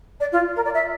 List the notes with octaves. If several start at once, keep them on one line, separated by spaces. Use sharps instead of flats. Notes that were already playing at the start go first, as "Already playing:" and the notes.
D5
F4
A#4
D5
E5